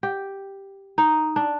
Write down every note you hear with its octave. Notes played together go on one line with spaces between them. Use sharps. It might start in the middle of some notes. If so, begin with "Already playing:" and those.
G4
D#4
D4